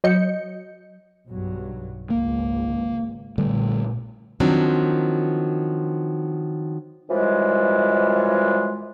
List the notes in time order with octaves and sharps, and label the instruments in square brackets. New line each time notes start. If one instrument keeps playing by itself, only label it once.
[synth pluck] F#3 D#5 G6 C#7
[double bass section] B1 G2 F#3
[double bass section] G#1 C#2 [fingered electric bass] A#3
[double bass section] A#1 A#2 [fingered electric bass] D3 G3 A3
[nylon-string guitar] D#3 F3 F#3 C4 D4
[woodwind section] F#2 E3 F3 G3 G#3